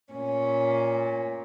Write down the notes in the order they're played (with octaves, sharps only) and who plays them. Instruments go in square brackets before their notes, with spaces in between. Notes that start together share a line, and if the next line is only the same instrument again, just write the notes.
[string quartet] A#2 C#4